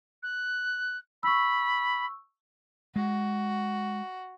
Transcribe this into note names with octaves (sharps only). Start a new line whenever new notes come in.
F#6
B5 C#6 E6
G#3 F#4